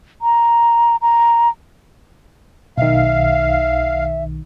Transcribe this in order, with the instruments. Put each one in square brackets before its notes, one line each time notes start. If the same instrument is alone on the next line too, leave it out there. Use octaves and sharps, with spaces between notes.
[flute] A#5
A#5
[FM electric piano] B1 D#3 [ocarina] E5 [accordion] F5